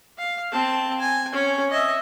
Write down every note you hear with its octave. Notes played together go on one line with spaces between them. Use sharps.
F5
C4 A5
G#5
C#4 C#5
D#5 E5